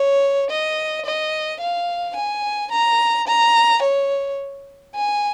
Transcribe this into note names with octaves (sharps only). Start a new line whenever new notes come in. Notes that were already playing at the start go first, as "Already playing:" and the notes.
Already playing: C#5
D#5
D#5
F5
G#5
A#5
A#5
C#5
G#5